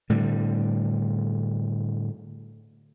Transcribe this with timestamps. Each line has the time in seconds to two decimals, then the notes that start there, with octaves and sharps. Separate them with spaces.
0.10 A2 D3 G3